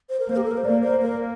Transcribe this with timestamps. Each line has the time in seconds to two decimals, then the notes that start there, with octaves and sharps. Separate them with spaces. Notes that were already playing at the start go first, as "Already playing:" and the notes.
0.09 C5
0.19 A#4
0.28 A#3 C5
0.36 G4
0.44 A4
0.51 A#4
0.57 C5
0.65 A#3 D5
0.83 C5
1.02 A#4